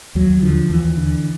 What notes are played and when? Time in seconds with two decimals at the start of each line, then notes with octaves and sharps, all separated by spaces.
0.15 D#2 F#3
0.42 D3 F3
0.70 D#2 E3
0.97 D3